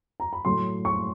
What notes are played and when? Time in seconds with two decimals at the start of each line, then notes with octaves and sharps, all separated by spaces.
0.20 A#5
0.33 B5
0.45 A2 F#3 A3 C6
0.85 C#6